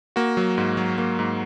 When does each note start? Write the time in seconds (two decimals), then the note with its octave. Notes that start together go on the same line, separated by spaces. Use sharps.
0.16 A#3 F#4
0.37 F#3
0.58 G#2
0.77 F#3
0.98 A#3
1.19 G#2